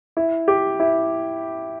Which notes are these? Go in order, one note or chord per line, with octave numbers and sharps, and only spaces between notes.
E4
G4
E4